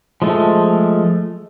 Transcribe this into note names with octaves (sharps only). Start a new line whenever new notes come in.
F3 G#3 A3